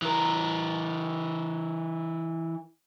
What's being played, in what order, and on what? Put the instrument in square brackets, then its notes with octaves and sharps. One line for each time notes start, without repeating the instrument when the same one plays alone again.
[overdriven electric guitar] E3 A#4